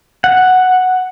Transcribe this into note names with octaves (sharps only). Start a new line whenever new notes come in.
F#5